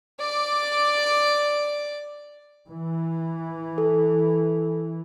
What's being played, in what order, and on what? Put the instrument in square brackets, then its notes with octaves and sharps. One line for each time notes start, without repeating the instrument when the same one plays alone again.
[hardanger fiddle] D5 D6
[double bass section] E3
[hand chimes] A4